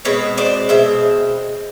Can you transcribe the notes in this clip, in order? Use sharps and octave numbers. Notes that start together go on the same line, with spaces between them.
B2 G#3 C4 B4 C#5
C5 D5
B2 G#3 C4 E5